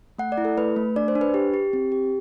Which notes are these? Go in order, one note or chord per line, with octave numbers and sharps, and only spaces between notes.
A3 F#5
D5
E4
A4
A3 B4
A3
D4 D5
C5
D4
B4
G4
G4
C4
G4